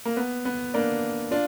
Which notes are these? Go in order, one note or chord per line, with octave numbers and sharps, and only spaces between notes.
A#3
B3
B3
A#3 D4
D4 F4